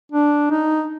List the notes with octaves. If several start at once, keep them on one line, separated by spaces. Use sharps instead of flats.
D4
D#4